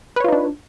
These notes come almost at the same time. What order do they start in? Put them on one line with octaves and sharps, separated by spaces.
B4 C#5 F4 D#4 D4